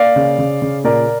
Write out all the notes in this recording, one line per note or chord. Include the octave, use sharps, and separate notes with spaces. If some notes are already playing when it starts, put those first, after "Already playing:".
Already playing: A#3 D5 F5
C#3
C#3
C#3
A#2 A#4 D5